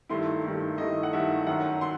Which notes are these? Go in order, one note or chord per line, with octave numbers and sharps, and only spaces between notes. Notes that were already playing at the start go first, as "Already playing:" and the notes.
G2 D#3 A3 E4 C6
G2 D#3 A3 E4
G2 D#3 A3 E4 D#5
F#5
G2 D#3 A3 E4 E5
F#2 D#3 F#3 F#5
F#3 C6